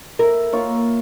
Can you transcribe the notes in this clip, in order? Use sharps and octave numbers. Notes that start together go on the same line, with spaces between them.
E4 A#4
A#3 F4 C#5